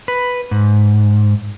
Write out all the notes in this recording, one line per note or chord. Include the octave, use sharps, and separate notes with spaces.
B4
G#2